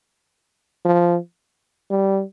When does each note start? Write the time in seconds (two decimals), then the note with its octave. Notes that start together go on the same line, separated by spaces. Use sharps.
0.85 F3
1.90 G3